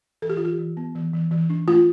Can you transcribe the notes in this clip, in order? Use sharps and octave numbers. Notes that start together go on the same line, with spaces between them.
E3 A4
G4
F4
E3 G4
E3
B3
E3
E3
E3
D4
A3 F4